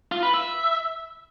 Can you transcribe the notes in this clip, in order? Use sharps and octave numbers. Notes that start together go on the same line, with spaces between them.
F4
B4
E5